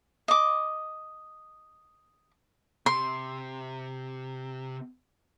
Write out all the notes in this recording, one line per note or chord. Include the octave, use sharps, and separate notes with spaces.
D#5 D6
C3 C6